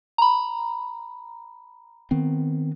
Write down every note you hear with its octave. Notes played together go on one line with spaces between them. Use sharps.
A#5 B5
D#3 B3 C4